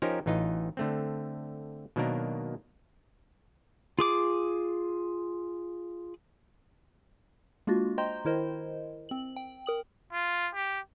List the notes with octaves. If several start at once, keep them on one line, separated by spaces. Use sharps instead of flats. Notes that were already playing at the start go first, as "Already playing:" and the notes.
F3 C#4 D#4 G4 A#4 C5
A1 E3 D#4 F4 D#5
D3 A3 C4
B2 D#3 F#3 A#3 D4 A#4
F4 G#4 D6
G#3 A#3 D4 F4 F#4
C5 D#5 G5 A#5 C6 G6
D#3 E4 A#4 C5 D#5
C4 F#7
G5
A#4 D#6 F#7
F4
G4